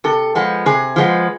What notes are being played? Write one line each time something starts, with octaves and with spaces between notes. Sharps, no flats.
C3 A4
F3 G#3 B3
C3 G#4
F3 G#3 B3